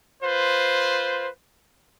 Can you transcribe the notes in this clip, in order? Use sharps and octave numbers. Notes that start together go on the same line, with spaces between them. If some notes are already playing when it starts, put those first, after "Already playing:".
F4 B4 C5